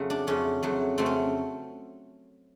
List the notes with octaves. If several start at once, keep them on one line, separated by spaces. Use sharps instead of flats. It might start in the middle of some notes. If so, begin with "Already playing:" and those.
Already playing: F2 C#3 F#3 A3
D4
F2 C#3 F#3 A3 C#4
F2 C#3 F#3 A3
F2 C#3 F#3 A3 C4
C#4